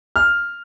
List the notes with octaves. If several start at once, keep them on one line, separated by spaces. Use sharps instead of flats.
F6